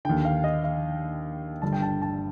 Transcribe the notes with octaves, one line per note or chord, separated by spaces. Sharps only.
D#2 D3 G5
F5
D#5
F5
G1 G2 D3 A5
G5
A5
A5